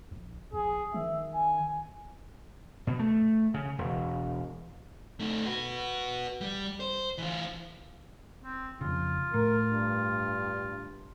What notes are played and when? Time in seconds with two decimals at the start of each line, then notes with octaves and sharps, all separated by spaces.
0.11 A#1
0.53 A#1 G#4
0.94 D#3 E5
1.34 G#5
2.87 B2
2.99 A3
3.54 C#3
3.78 E1
5.19 A3 D#4
5.46 F#4 B4
6.41 G3
6.80 C5
7.18 E3 F4
8.43 C4
8.81 F2 C#3 F4
9.34 A2 A#4
9.72 G2